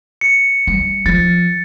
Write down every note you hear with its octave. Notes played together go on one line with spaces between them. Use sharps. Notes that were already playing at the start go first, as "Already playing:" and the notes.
C#7
G3
F3 A6